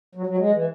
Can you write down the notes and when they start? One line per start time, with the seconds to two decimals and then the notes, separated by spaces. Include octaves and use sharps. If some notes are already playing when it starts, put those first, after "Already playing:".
0.15 F#3
0.26 F#3
0.38 G#3
0.52 E3